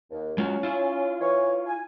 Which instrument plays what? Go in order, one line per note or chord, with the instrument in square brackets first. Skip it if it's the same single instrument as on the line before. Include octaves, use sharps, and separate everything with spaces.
[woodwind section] D#2
[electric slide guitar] G#3 F4 F#4 [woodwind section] C#4
[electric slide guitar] E4 F4
[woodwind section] E3 C#5
G#5